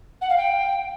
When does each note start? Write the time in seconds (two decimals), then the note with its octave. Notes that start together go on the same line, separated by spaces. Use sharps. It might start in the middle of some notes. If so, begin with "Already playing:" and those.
0.21 F#5
0.29 F5
0.37 G5